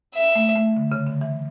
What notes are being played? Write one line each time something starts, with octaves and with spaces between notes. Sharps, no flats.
E5
A3
A3
D3
C#3
D3
E3